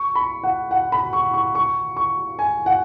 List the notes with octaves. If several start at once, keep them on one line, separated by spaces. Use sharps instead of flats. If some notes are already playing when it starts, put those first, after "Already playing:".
Already playing: C#6
B5
F#5
F#5
B5
C#6
C#6
C#6
C#6
G#5
F#5